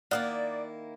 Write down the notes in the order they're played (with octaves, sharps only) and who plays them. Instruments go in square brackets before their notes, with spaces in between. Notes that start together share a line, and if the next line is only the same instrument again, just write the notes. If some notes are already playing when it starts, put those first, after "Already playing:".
[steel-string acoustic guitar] D#3 A#3 E4 [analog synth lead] D5 [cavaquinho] F5 F#5 D#6